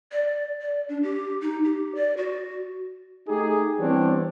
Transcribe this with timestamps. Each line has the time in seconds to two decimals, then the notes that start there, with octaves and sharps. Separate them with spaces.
0.12 D5
0.62 D5
0.89 D4
1.03 G4
1.41 D#4
1.64 G4
1.95 D5
2.17 F#4
3.28 A3 D#4 G4 G#4
3.79 E3 G3 B3 C4 D4 C#5